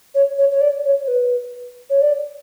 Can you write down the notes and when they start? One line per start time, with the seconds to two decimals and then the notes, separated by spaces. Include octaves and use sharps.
0.15 C#5
0.38 C#5
0.51 C#5
0.61 D5
0.85 C#5
1.04 C#5
1.08 B4
1.90 C#5
2.01 D5